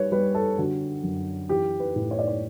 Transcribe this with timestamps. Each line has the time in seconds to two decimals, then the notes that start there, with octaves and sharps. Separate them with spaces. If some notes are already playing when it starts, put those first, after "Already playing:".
Already playing: G3 B4 C#5
0.12 G3 B4
0.35 A4
0.58 D3 F#4
1.03 F#2
1.49 E3 G4
1.80 B4
1.96 A2
2.11 C#5
2.19 D5
2.28 C#5